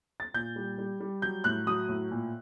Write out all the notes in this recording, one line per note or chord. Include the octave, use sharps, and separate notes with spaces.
A6
A#2 G6
G3
G3
G3
F#3 G6
A2 F#6
F#3 D#6
A2
A#2